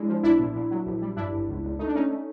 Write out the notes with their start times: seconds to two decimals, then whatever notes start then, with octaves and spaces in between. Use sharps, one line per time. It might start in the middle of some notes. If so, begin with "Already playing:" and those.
Already playing: G#3 D4 E4
0.09 F3
0.23 B1 D4 E4
0.40 A#2
0.56 A#2
0.71 F#3
0.86 A#1
1.01 G3
1.16 G2 D4 E4
1.32 G1
1.48 C#2
1.64 C#2
1.79 A3 D#4
1.88 D4
1.95 A3 C#4 D#4
2.10 A3